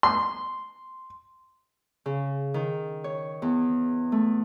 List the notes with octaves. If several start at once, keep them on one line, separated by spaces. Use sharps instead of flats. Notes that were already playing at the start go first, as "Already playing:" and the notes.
C6
C#3
D#3
C#5
E2
A3